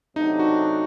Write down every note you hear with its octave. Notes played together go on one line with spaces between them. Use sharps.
C3 F#3 A3 D4 D#4
F#4